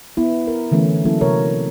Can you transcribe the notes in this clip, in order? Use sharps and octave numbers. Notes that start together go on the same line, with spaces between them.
B3 E4
A#4
D3 E3 A3 C#4
F#3 A#3 C#4 E4 A4
C3 A#4 C#5